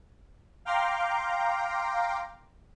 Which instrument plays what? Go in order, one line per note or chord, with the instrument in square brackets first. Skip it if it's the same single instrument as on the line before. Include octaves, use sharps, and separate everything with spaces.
[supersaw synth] F5 G5 A#5 C6 D6